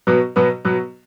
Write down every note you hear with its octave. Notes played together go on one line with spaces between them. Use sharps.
B2 F#3 B3
B2 F#3 B3
B2 F#3 B3